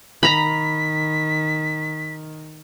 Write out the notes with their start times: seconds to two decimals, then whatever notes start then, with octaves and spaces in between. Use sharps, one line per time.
0.23 D#3 A#5 B5 B6